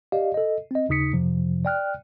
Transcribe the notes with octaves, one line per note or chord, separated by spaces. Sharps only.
G4 D5 D#5 F5
A4 D#5
C4 D#5
D#2 C#3 D#4 D#6 B6 C#7
F2 C3 F3
D5 G5 F6 F#6